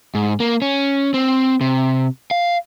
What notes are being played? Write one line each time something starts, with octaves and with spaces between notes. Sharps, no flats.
G#2
A#3
C#4
C4
C3
F5